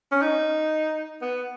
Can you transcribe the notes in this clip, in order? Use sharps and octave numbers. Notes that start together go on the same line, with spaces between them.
C#4
D#4
B3